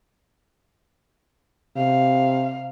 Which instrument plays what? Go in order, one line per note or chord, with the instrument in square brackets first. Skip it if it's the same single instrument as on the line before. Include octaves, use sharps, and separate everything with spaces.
[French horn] C3 [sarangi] F5